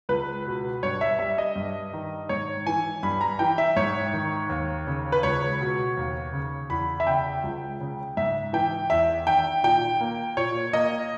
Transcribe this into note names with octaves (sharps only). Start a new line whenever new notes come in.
C#2 B4
B2
G2 C#5
E5
G3 E5
D#5
G2
D#3
G#2 C#5
E3 G#5
G2 B5
A#5
E3 G5
E5
G#2 C#5
D#3
D#2
C#3
B4
C#2 C#5
B2
D#2
C#3
E2 B5
E5
C#3 G5
C#2
C#3
G#2 E5
E3 G5
E2 E5
D#3 G5
A#2 G5
A#3
A#2 C#5
A#3 D#5